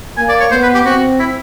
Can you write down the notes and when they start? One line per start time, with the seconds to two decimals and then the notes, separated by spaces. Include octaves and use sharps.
0.17 A#3 G#5
0.29 D5
0.40 C#5
0.51 B3 C5
0.63 B4
0.74 G4
0.85 C4 F#4
1.20 E4